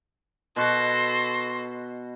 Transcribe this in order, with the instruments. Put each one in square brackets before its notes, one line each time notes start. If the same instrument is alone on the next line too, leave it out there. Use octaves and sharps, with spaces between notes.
[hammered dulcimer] B2 F#4 [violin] A4 A#6 [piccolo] C6